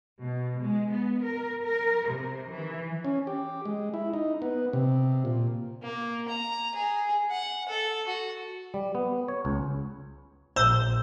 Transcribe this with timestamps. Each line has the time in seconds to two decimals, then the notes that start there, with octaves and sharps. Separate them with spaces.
0.21 B2
0.60 G#3
0.90 B3
1.22 A#4
1.63 A#4
2.08 C3
2.49 E3
3.05 C#4
3.27 G4
3.65 G#3
3.94 E4
4.13 D#4
4.42 B3
4.73 C3
5.25 A#2
5.83 A#3
6.28 A#5
6.75 G#4
7.31 F#5
7.69 A4
8.08 F#4
8.74 G3
8.95 B3
9.28 C#5
9.45 C#2
10.56 A#1 C5 E6